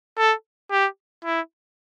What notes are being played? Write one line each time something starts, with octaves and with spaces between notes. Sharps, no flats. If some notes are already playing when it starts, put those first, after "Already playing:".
A4
G4
E4